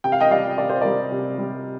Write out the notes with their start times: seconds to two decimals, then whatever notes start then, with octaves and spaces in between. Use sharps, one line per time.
0.04 C3 G5
0.12 F5
0.20 D#5 G5
0.31 G3 D5 F5
0.58 C3 D5
0.69 C5
0.81 G3 A#4 D5
1.11 C3
1.38 G3